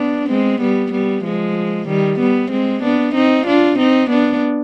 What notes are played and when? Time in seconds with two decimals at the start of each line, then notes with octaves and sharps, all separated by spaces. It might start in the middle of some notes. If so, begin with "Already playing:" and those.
Already playing: B3 D4
0.29 G#3 C4
0.61 G3 B3
0.92 G3 B3
1.24 F3 G#3
1.88 D#3 G3
2.20 G3 B3
2.51 G#3 C4
2.83 B3 D4
3.15 C4 D#4
3.47 D4 F4
3.79 C4 D#4
4.10 B3 D4